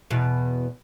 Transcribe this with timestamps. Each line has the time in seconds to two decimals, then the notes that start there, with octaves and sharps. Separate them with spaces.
0.10 E2 B2